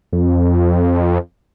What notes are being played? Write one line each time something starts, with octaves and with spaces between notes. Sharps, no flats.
F2